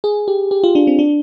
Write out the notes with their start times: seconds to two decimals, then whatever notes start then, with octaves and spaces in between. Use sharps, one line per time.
0.04 G#4
0.28 G4
0.51 G4
0.64 F4
0.75 D4
0.87 C4
0.99 D4